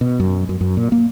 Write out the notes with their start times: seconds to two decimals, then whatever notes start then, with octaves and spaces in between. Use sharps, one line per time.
0.01 B2
0.20 F#2
0.49 F#2
0.61 F#2
0.77 A#2
0.92 A#3